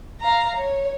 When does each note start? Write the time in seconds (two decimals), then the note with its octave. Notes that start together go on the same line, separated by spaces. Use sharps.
0.21 F5 A#5
0.56 C#5